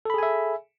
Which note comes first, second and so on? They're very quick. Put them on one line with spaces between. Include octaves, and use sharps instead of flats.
A4 B5 G#4 G#5 E5